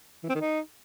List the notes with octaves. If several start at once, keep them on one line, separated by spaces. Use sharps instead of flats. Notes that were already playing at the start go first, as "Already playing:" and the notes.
E3
C4
D#3
D#4